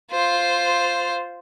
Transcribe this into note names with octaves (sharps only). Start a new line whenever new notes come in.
F4 C5